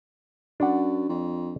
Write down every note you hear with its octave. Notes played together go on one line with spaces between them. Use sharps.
F#2 D4 F#5
F2